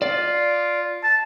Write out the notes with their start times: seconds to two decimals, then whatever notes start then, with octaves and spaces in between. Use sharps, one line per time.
0.02 F4 D5
1.04 A5